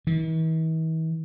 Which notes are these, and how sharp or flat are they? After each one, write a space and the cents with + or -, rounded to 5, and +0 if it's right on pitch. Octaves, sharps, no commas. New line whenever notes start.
E3 -45